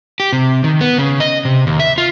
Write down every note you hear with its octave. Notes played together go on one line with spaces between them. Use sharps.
G4
C3
D#3
B3
C#3
D#5
C3
D#2
E5
F4